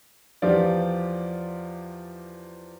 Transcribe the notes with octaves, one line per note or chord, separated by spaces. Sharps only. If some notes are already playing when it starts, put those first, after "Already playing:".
E2 F3 F4 G4 D5